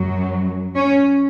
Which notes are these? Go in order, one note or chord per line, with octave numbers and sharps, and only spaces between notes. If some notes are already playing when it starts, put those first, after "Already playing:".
Already playing: F#2 F#3
C#4